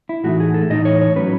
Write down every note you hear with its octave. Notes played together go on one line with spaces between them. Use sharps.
E4
A2 E3 A3 D#4 F#4
G#4
A4
A2 E3 A3 D#4 D#5
C#5
C#5
A2 F#3 C#4 B4